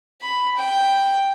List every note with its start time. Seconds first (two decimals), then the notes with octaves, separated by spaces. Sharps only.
0.22 B5
0.57 G5